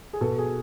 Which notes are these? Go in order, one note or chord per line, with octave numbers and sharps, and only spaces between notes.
G#4
B2 A4
G#4